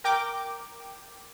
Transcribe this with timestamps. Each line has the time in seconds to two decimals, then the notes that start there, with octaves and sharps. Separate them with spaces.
0.04 A#4 G5 D6